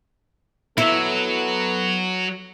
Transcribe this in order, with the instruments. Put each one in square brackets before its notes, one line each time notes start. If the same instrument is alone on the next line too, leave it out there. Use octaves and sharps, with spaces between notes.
[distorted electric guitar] F#3 [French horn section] B3 A4 [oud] E4